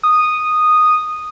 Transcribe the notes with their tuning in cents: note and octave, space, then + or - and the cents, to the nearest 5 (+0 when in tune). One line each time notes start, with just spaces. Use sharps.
D#6 -10